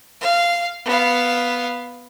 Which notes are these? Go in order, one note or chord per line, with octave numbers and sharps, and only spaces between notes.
F5
B3 F5